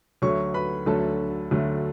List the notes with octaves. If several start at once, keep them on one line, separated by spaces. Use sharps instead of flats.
D2 D3 F#3 A3 C#5 C#6
B4 B5
D2 D3 F#3 A3 A4 A5
D2 D3 F#3 A3